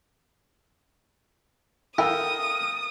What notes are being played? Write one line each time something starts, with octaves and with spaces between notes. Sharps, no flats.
E4 A4 A#4 F5 G5 D#6